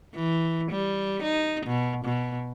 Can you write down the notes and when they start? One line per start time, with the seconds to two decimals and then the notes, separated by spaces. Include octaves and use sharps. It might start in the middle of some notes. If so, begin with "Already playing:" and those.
0.15 E3
0.71 G3
1.23 D#4
1.66 B2
2.05 B2